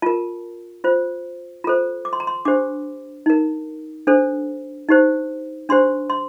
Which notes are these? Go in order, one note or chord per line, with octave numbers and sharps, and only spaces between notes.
F4 A#4 A5
F4 C5
F4 A4 C5 A#5
D6
C6
A#5
C6
D4 G4 C5 D6
D#4 A#4
D4 A4 C5
D#4 G4 C5
D4 G4 C5 C6
C6